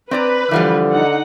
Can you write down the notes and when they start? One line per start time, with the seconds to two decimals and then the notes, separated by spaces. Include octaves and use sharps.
0.11 C4 B4 D5 A#5
0.51 D3 E3 F3 G3
0.93 D#4 F#5